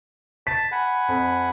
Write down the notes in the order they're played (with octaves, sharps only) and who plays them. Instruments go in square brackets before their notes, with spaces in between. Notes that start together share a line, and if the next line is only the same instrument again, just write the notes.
[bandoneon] A5 [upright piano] B6
[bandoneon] F#5 G#5 B5
[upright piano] F2